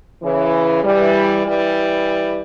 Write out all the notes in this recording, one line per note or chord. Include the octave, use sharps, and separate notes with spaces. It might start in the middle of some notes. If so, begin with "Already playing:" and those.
C#3 E3
E3 G3
E3 G3